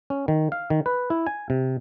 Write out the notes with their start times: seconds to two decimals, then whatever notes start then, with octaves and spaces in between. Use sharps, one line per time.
0.10 C#4
0.28 D#3
0.52 F5
0.70 D#3
0.86 B4
1.10 E4
1.27 G#5
1.50 C3